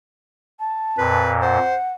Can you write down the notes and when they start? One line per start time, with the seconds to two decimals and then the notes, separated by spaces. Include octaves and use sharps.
0.59 A5
0.98 F2 A#2 B4
1.42 C5 F#5